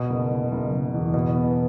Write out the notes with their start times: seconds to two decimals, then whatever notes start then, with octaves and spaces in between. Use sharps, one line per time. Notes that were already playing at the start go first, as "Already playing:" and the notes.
Already playing: B2
0.10 F#1
0.30 F#1
0.52 F#1
0.72 F#1
0.94 E2
1.14 B2
1.35 B3